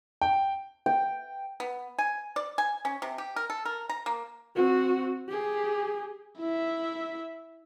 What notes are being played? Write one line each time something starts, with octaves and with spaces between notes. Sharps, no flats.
G5
G5
B3
G#5
D5
G#5
C#4
C3
G4
A#4
A4
A#4
A#5
A#3
C4 F#4
G4 G#4
E4 E5